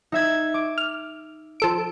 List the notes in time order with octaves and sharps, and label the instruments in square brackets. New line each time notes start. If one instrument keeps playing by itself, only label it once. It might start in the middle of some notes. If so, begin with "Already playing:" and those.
[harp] D#4 E5 G#6
D6
[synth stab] F6
F3 A4 D7